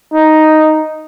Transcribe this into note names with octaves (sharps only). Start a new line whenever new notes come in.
D#4